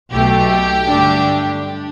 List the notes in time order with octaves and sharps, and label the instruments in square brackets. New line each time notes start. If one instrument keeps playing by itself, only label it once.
[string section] B1 B2 A3 G4
G2 D3 A3 D4
D4